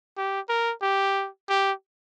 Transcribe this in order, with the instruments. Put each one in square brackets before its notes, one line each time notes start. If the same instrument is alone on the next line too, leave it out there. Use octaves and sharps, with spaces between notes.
[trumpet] G4
A#4
G4
G4